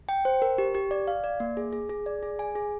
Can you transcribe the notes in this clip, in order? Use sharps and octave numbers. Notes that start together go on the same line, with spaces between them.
G5
C5
A#4
G4
G4
D5
F5
D5
A#3
G#4
G#4
G#4
D5
G#4
G#5
G#4